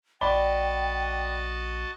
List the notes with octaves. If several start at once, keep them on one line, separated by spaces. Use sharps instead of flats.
A#1 F#4 D5 D#5 G5 A5 B5 G7